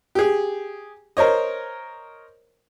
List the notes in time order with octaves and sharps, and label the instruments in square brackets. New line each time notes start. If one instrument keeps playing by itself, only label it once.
[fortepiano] G4 G#4
A#4 C5 C#5 D#5